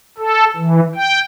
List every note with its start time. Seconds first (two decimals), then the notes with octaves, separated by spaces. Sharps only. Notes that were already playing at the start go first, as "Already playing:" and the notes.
0.18 A4
0.56 E3
0.95 G5